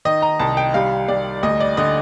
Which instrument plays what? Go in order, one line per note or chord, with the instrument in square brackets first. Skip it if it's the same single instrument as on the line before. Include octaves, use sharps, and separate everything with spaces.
[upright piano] D#3 D#5
A#5
C2 A5
G5
G3 F5
G3 D5
D2 D#5
D5
D3 D#5